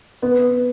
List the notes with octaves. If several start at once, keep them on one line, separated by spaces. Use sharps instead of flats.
B3